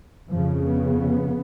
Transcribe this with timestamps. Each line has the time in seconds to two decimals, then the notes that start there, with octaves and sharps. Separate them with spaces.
0.28 F2 C#3 F3
0.66 B3